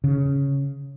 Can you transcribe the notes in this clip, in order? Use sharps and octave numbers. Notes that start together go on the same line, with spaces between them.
C#3